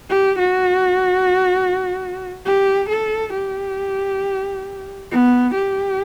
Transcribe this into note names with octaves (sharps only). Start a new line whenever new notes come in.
G4
F#4
G4
A4
G4
B3
G4